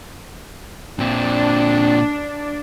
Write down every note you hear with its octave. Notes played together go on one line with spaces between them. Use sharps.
A#2 C4 D4